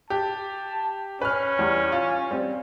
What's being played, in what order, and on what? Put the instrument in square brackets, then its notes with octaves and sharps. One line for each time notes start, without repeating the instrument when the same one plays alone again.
[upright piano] G4 [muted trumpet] A5
[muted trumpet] C#4 [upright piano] B4 F6
[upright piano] E2 G3
F4
G3 C4